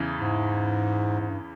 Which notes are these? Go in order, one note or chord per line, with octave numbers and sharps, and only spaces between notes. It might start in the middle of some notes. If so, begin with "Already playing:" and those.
Already playing: E2 C#3 E3
G#2
G#2
G2